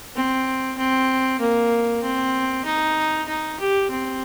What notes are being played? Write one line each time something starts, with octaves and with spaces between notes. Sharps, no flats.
C4
C4
A#3
C4
D#4
D#4
G4
C4